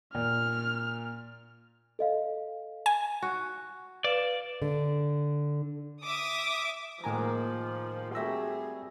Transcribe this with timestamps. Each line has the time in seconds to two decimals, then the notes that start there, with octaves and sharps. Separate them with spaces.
0.15 A#2 F6
1.99 A4 D#5 F5
2.86 G#5
3.22 F#4
4.04 B4 D5 F5 E7
4.62 D3
6.04 E5 D6 D#6
7.04 A2 D#3 F3 G#3 A#3 G#5 A#5
8.15 G3 A3 C4 F#4 G#4 E5 E6 A#6